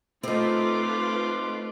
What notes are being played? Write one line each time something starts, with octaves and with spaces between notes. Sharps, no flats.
A3 C4 D#4 F4 B4 C6 D6